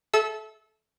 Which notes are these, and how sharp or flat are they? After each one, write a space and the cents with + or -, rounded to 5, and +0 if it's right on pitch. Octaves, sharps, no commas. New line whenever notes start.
A4 -20 E5 -5 E6 -25